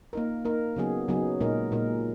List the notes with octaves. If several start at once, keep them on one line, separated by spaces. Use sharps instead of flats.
A#3 D#4 A#4
A#3 D#4 A#4
C#3 F#3 B3 D#4 G#4
C#3 F#3 B3 D#4 G#4
A#2 G#3 D#4 A#4
A#2 G#3 D#4 A#4